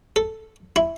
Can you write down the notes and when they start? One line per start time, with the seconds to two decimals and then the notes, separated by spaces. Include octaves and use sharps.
0.16 A4
0.76 E4